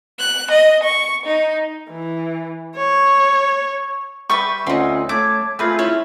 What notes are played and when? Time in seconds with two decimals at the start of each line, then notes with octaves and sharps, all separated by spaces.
0.20 F#6
0.52 D#5
0.84 C#6
1.27 D#4
1.90 E3
2.77 C#5
4.30 G3 B4 E5 G5 C#6
4.67 D2 C4 C#4 D#4 F4 G5
5.09 A3 C#5 A5 D6 G#6
5.59 A3 C4 F4 G#4 B4 E5 F6
5.79 E4 C#5